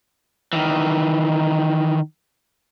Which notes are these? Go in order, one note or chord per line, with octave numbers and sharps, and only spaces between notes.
D#3 E3